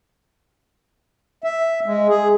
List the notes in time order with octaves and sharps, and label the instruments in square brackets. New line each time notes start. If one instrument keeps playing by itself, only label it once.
[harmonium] E5
G#3
G#4